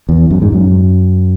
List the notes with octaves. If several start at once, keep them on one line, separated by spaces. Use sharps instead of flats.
E2
F#2
G#2
F#2